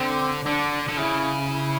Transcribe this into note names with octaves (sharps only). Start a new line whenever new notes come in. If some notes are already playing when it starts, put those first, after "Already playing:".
Already playing: D3 C4
D3 D4
D3
C#3 E4
E4